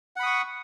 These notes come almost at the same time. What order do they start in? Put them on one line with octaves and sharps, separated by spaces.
F#5 B5 D#6 C#6